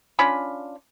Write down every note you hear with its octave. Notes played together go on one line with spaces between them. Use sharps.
C#4 D4 F4 B5